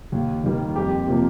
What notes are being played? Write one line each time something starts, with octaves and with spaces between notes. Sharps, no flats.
D#2
D#3 G3 A#3
F2 G4
C3 F3 A#3